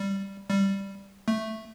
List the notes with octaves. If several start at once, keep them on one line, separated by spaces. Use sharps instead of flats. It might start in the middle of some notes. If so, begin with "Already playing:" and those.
Already playing: G3
G3
A3